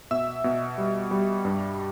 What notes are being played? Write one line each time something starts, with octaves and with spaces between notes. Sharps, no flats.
B2 E5 E6
B2
G3
G3
G2